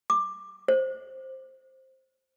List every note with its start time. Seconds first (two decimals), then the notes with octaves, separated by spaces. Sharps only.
0.10 D6
0.68 C5